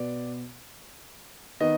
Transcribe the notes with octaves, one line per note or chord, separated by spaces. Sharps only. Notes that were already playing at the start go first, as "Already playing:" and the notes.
Already playing: B2 B3 D5
D#3 B3 D#5